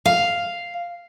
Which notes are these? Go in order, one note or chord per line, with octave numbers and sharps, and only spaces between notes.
F5